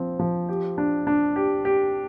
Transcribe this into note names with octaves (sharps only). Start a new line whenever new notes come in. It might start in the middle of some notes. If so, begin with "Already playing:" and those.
Already playing: F3 C4
F3
G4
D4
D4
G4
G4